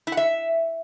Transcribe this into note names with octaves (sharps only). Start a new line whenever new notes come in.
E4
F#5
E5